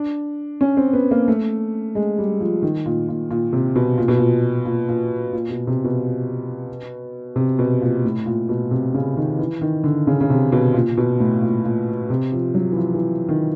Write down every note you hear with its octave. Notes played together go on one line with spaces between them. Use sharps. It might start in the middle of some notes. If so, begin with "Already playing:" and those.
Already playing: D4
C#4
C4
B3
A#3
A3
G#3
G3
F3
D#3
A#2
A#2
A#2
C3
B2
A#2
B2
A#2
A#2
A#2
A#2
B2
C3
B2
C3
B2
A#2
A2
A#2
B2
C3
C#3
D#3
E3
D#3
D3
C#3
C#3
C3
B2
A#2
B2
A2
A#2
A#2
C3
F3
F#3
E3
F3
E3
D#3